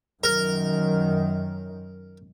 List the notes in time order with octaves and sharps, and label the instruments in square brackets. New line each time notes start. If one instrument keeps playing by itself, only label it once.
[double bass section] F#2 D#3 [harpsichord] A#4